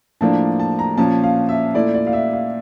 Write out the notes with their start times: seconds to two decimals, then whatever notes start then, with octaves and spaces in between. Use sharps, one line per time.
0.21 A2 F3 A#3 D4 A5
0.59 A5
0.79 A#5
0.97 A#2 F3 C#4 A5
1.24 F5
1.49 E5
1.74 A#2 A3 E4 D5
1.94 D5
2.07 F5
2.13 E5
2.33 F5